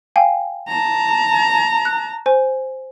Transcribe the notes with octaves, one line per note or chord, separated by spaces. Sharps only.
F5 G5 G#5
A5 A#5
F#6
C5 G#5